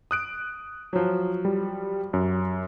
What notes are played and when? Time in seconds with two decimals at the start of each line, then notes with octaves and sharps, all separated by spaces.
0.11 D#6 F#6 D7
0.93 F3 F#3
1.45 G3
2.13 F#2